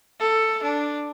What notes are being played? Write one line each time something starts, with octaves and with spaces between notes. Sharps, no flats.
A4
D4